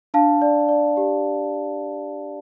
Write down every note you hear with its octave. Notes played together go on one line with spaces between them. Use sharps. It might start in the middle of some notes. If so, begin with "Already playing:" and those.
D4 F5 A5
D5
D5
G4